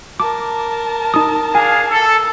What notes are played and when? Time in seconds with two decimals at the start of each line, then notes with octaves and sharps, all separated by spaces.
0.20 A#4 A5 D6
1.14 D#4 D#6
1.55 D4 G#4 F5 G#5
1.90 A4